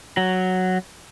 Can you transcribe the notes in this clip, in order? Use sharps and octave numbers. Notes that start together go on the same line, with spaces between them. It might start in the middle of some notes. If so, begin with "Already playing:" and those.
F#3